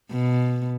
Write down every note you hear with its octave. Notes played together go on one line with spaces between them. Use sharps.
B2